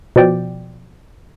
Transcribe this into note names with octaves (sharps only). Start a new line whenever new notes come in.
B2 F3 D5 G5